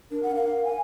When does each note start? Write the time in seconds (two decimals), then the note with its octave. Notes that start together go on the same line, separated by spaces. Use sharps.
0.11 D4 A#4
0.23 F#5
0.35 F5
0.64 G#5